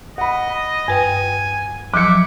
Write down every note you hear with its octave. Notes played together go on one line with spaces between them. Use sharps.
D#5 F#5 B5
G2 B4 G5 G#5
F3 F#3 E4 D6 C#7